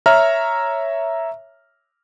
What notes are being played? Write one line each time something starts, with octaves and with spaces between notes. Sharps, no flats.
C#5 E5 A#5 F6